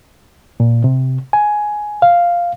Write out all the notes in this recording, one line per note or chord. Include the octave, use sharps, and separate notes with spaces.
A#2
C3
G#5
F5